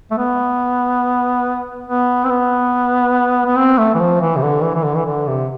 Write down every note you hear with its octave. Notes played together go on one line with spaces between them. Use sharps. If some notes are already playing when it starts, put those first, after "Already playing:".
A3
B3
B3
C4
B3
B3
C4
A3
E3
F3
E3
C3
D3
E3
E3
D3
E3
D3
C3